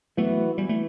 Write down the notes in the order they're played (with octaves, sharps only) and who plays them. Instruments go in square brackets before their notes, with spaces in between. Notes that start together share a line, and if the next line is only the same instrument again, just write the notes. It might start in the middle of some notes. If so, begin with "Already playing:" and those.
[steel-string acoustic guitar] E3 B3 F#4 [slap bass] F#3 A3
[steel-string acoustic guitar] E3 [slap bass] G3
[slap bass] A3